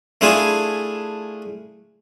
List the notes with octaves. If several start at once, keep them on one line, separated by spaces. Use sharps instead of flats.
A3 D4 E4 F4 G#4 G#5